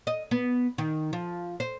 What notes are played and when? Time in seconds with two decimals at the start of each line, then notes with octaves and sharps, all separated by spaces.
0.07 D#5
0.31 B3
0.78 D#3
1.13 F3
1.60 C5